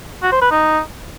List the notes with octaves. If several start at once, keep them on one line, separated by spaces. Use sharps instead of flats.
F#4
C5
B4
D#4